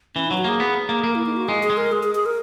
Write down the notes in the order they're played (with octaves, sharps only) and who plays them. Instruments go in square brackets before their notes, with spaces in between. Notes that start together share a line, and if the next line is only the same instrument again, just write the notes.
[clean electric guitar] E3 [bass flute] C#4
[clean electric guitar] F#3 [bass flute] D#4
[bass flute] F#4
[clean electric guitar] A#3 [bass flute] G#4
[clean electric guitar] B3
A#3
[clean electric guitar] A#3 [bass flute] A#4
[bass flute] E4
D#4
F#4
[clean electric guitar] G#3 [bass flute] G#4
[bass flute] G#4
[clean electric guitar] G#3
[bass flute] A#4
G#4
G#4
G#4
A#4